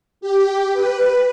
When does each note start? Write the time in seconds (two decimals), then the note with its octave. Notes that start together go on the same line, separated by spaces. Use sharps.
0.21 G4
0.73 B4